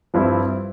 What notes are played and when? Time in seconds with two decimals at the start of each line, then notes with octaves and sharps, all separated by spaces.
0.14 G2 F3 C4 E4